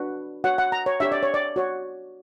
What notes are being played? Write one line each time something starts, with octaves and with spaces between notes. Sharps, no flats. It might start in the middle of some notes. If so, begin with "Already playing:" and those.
Already playing: D4 F#4 B4
F#4 C#5 F#5
F#5
A#5
C#5
D4 G4 C#5 E5
D5
C#5
D5
F#4 C#5